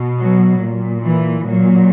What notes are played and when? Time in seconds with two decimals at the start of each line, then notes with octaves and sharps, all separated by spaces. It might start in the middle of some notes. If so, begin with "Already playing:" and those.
Already playing: B2
0.18 F#3
0.61 A#2
1.03 E3
1.44 A#2 F#3